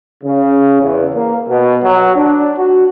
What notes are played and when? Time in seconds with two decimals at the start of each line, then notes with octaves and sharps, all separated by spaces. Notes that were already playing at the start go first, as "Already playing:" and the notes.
0.24 C#3
0.81 E2
1.15 A#3
1.49 B2
1.84 F#3
2.17 D4
2.58 F#4